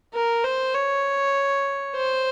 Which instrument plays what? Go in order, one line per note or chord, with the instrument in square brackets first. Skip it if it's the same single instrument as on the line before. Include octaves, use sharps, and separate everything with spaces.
[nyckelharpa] A#4
C5
C#5
C5